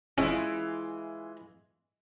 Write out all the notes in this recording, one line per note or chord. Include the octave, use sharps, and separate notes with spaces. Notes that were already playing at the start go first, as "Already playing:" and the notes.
E3 G#3 C#4 E4 F4